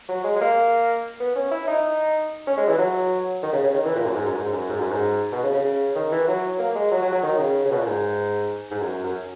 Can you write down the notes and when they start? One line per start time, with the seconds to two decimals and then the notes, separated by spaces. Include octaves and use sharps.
0.08 F#3
0.24 G#3
0.36 G#3
0.41 A#3
1.20 B3
1.35 C#4
1.51 E4
1.67 D#4
2.47 C#4
2.57 G#3
2.68 E3
2.78 F#3
3.42 D#3
3.52 C#3
3.63 C#3
3.73 D#3
3.84 E3
3.95 A#2
4.05 F#2
4.16 G#2
4.27 F#2
4.37 G#2
4.53 F#2
4.69 G#2
4.80 F#2
4.91 G#2
5.32 B2
5.43 C#3
5.53 C#3
5.64 C#3
5.95 D#3
6.12 E3
6.27 F#3
6.59 A#3
6.75 G#3
6.91 F#3
7.02 F#3
7.12 F#3
7.23 D#3
7.39 C#3
7.65 C#3
7.71 B2
7.79 A#2
7.86 G#2
8.71 G#2
8.82 F#2
9.04 F#2